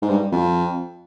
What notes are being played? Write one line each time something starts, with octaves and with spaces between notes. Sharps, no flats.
G#2
G2
F2